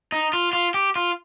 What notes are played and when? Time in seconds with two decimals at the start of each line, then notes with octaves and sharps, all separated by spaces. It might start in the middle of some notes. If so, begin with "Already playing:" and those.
0.12 D#4
0.33 F4
0.53 F4
0.74 G4
0.96 F4